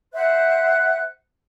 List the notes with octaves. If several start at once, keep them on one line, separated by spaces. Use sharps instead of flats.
C5 E5 F#5 F#6